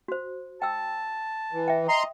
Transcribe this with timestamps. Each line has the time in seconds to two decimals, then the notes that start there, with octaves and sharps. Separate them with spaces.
0.08 F#4 C5
0.62 G5 A5 E6
1.52 E3
1.68 E5 G5
1.89 D#5 A#5 C6